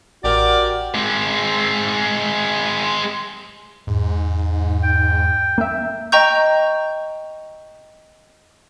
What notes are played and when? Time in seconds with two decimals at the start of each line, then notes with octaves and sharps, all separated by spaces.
0.24 A1 F#4 G4 A#4 D5
0.94 G#3 C4
3.87 E2 G#2
4.83 G5
5.58 A#3 E5
6.12 D#5 G5 A#5 C#6 G6